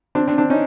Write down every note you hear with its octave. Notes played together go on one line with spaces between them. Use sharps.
C4 D4
C4 D4
C4 D4
C#4 D#4